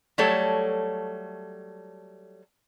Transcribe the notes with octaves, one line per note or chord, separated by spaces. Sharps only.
F#3 G3 A3 A4 C#5